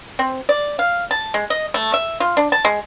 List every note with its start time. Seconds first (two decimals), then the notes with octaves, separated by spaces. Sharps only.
0.19 C4
0.49 D5
0.79 F5
1.11 A5
1.34 G#3
1.50 D#5
1.74 A3
1.94 E5
2.20 F4
2.37 D4
2.52 A5
2.65 G#3